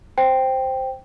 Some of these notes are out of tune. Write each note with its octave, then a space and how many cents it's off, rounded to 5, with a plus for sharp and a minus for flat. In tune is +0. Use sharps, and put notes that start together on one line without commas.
C5 +0 G5 +0